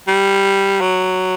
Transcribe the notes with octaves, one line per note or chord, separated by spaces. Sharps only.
G3
F#3